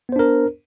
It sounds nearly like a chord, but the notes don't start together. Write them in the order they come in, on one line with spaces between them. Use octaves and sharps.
B3 C5 D4 A#4